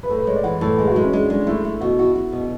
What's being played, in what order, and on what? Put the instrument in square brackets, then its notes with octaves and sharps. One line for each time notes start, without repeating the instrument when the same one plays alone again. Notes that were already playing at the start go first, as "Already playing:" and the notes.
[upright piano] B4
[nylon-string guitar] A2 [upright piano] A4
[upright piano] B4
[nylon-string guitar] G#3 [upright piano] C#5
[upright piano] D5
[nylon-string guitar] E3 [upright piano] F#5
[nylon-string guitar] A2 [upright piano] A4
[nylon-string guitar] G#3 [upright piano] G#4
[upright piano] F#4
[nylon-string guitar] G#3 [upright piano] E4
[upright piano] C#4
[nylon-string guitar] G#3 [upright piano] D4
[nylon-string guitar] G#3 [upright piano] D4
[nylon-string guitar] A3 [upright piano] E4
[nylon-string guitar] A3
[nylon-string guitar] B2 [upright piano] F#4
[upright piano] E4 [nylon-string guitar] F#4
[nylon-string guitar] F#4
B2